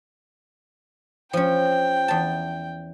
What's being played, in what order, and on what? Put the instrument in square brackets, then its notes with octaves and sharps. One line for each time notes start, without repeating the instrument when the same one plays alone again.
[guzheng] F3 C#4 [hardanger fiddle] G5
[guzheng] E2 A5